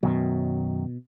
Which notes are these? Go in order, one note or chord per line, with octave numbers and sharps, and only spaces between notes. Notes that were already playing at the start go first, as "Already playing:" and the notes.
F#2 B2 D#3 F#3